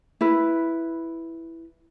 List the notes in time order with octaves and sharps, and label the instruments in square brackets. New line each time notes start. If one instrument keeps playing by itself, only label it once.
[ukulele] E4 B4